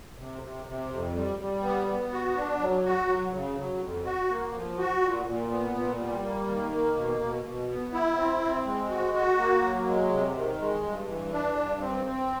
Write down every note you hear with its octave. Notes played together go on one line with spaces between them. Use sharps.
C3
C3
C3
F2
G3
G3
B3
B3
F#4
D4
F#3
F#4
F#3
C#3
F#3
F2
F#4
A#3
F3
F#4
A#2
A#2
B3
A#2
G3
A#3
D#3
A#3
B2
B2
B2
B3
E4
C4
C4
G#3
F#4
F#4
A#3
F#3
G#3
C3
D#3
G#3
G2
E3
D4
G2
C4
C4